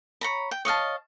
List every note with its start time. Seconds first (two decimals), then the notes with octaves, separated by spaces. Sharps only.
0.21 C#5 A#5 B5
0.51 G5
0.65 C#5 D#5 F5 A5